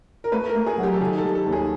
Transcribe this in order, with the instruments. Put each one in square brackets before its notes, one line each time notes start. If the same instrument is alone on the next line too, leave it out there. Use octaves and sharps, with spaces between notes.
[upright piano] A#4
[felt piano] A3 [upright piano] B4
[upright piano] A#4
[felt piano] A3
[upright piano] G#4
[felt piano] F#3
[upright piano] G4
A4
[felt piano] D#3 [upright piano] G#4
[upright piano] A4
[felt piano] G3
[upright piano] A4
[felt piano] D#2
[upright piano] G#4